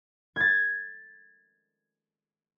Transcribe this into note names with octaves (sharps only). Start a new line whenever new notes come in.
G#6 A6